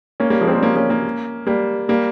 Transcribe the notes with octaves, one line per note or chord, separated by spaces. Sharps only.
A#3 C#4
G3 A#3
F3 G#3
C4
G3 A#3
A#3 C#4
A#3 C#4
A#3 C#4
G3 A#3
G3 A#3